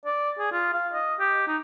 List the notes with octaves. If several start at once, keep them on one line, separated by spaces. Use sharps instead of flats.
D5
G#4
F4
F5
D#5
G4
D#4